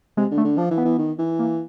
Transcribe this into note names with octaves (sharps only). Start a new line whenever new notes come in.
C3 G#3
D3
A3
D3
F3 D4
E3
B3
E3
D#3
E3
A#3